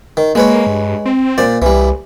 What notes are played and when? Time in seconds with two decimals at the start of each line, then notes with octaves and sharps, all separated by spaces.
0.17 D#3
0.35 G#3 A#3 B4 C#5
0.67 G2
1.06 C4
1.38 A#2 C5 D5
1.62 C2 E3 G3